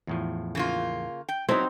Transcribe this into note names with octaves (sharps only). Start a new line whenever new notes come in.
E2 A2 F3
C#3 A#3 F4
G5
F#3 B3 C4 D#4 E4 C5